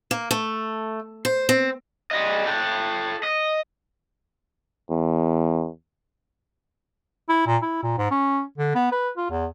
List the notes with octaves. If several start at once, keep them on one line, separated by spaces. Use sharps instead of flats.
A#3
A3
C5
C4
G3 D#5
A4 G5
D#5
E2
E4
A#2
E4
A#2
G#2
C#4
D3
B3
B4
F4
E2